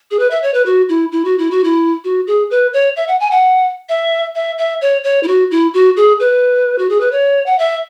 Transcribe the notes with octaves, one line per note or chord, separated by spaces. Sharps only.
G#4
B4
E5
C#5
B4
F#4
E4
E4
F#4
E4
F#4
E4
F#4
G#4
B4
C#5
E5
F#5
G#5
F#5
E5
E5
E5
C#5
C#5
E4
F#4
E4
F#4
G#4
B4
F#4
G#4
B4
C#5
F#5
E5